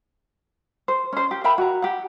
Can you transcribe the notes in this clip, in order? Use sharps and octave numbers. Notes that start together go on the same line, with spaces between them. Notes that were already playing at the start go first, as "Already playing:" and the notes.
C5
C#4 C5
G4
A#4 E5 G5 B5
F#4 A#5
G4 F#5